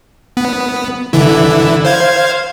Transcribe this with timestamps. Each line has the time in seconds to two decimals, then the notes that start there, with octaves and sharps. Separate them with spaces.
0.37 B3
1.13 D3 E3 E4
1.85 C5 F5 G#6